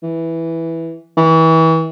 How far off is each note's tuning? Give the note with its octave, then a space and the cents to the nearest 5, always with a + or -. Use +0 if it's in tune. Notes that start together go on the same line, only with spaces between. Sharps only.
E3 -5
E3 -30